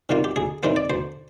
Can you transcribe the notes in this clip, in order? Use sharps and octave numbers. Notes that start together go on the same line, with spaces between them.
C3 D#3 G3 A#3 F4
G4
D2 G#4
C3 D#3 G3 A#3 C5
D5
D2 C5